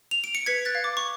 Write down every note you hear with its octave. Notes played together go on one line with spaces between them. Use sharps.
F7
D7
C#7
B4 G#6 B6
F#6 A6
F5
D6
C#6